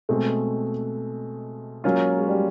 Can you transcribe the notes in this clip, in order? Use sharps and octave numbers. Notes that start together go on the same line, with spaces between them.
B2 G#3 A3 C4
F#3 G#3 A#3 C#4 F4
G#3
G3